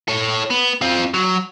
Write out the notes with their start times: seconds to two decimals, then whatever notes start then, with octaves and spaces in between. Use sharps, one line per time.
0.08 A4 C#5
0.50 B3
0.82 C4 F4
1.14 F#3